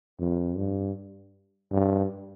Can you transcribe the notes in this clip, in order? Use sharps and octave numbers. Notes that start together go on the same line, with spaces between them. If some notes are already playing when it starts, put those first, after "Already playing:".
F2
G2
G2